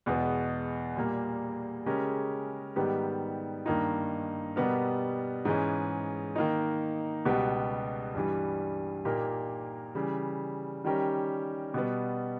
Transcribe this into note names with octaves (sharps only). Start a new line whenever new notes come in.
E2 B2 G#3 B3
A#2 G3 A#3
C#3 G#3 C#4 G4 A#4
G#2 D#3 G3 B3 G4
G2 D#3 A#3 D#4
B2 G3 B3 G4 A#4
G#2 E3 G#3 C#4
D#3 A#3 D#4
C#2 B2 G3 B3 G4
G2 E3 G3
A#2 A#3 D#4 G4 A#4
C#3 E3 G3
D#3 G3 C#4 G4 A#4
B2 G3 B3